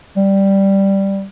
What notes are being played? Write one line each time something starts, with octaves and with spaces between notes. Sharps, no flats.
G3